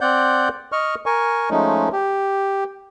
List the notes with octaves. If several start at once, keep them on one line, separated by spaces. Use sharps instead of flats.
C4 D5 F#5 G6
D#5 C#6 F6
A#4 G#5 C#6
F3 G#3 A3 C#4 D#4
G4